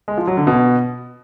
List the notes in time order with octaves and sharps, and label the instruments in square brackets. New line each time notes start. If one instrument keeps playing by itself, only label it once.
[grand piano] G#3
F3
F#3
D3
B2